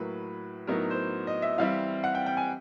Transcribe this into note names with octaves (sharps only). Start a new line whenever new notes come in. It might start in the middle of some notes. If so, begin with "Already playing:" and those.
Already playing: A2 F#3 A#3 B4
A2 F#3 B3 D#4 A#4
C5
D#5
E5
E3 G3 C4 E4 F5
F#5
G5
G5
G#5